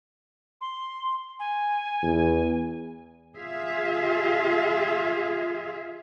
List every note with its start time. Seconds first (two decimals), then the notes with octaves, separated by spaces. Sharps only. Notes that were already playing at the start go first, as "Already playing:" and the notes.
0.61 C6
1.39 G#5
2.03 E2
3.36 F4 G#4 E5 F5